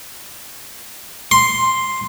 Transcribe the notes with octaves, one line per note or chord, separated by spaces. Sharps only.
C6